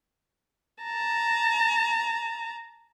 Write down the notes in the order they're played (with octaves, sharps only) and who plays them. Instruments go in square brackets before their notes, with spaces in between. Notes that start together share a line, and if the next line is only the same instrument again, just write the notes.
[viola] A5 A#5